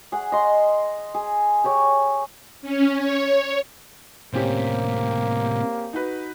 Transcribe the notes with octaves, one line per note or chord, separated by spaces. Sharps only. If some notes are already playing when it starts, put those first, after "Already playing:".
G#4 F#5
D#5 C6
G#4
G4 G#4 C#5
C#4
C#5
A2 C3 A#3 C4 C#4 G4
D#4 F#4 B4